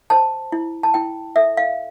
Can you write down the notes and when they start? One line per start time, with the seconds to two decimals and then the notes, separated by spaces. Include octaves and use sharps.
0.10 C5 A5
0.52 E4
0.83 A5
0.94 E4 G5
1.36 A4 E5
1.57 F5